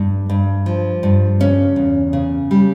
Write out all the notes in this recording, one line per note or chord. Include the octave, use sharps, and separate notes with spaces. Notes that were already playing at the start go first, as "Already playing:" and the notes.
Already playing: G2
G2
F3
G2
C#3 C#4
E2
C#3
G3